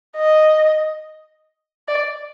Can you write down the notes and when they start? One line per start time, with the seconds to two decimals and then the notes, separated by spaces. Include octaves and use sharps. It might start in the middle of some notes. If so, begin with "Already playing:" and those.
0.17 D#5
1.88 D5